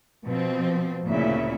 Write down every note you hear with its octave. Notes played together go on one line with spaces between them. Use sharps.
B2 F3 C4
D2 A#2 C#3 C4 E4 E5